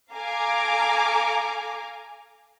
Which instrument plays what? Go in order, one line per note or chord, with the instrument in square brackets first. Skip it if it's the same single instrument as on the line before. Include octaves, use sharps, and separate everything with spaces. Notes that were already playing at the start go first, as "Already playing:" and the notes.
[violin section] A4 F5 G#5 A#5 D6